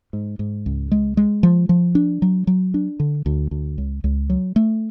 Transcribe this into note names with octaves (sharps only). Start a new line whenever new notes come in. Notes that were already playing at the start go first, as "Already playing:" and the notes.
G#2
G#2
C#2
G#3
G#3
F3
F3
D4
F#3
F#3
D4
D3
D2
D2
C#2
C#2
F#3
A3